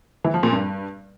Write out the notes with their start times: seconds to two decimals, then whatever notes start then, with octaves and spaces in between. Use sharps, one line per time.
0.24 E3
0.34 F3
0.43 A#2
0.52 G2